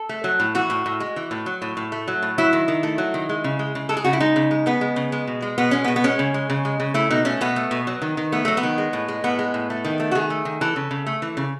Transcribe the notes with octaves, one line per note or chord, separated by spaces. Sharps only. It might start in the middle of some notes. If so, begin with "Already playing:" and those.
Already playing: A4
A3
F#3
A2
E3 F#4
A2
A2
G#3
E3
A2
F#3
A2
A2
A3
F#3
A2
F#3 E4
D#3
D#3
A3
F#3
D#3
G#3
C#3
G#3
C#3
G#3 A4
G#4
C#3 F#4
E4
G#3 D#4
C#3
G#3
C#3 B3
G#3
C#3
G#3
B2
G#3
B2 B3
G#3 C#4
B3
B2
B3
G#3 C#4
C#3
G#3
C#3
G#3
C#3
A3 E4
B2 D#4
A3 C#4
B2 B3
A3
B2
F#3
D#3
D#3
A3 B3
F#3 A3
B3
D#3
G#3
A2
G#3
A2 B3
G#3
A2
A3
D#3
A3
F#4
D#3 G#4
A3
D#3
E3 A4
C#3
C#3
A3
E3
C#3